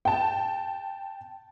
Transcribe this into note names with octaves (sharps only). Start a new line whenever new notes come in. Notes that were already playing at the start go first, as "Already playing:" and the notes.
G5 A5